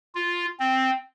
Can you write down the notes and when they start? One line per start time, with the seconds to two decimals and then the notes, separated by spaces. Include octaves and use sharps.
0.15 F4
0.60 C4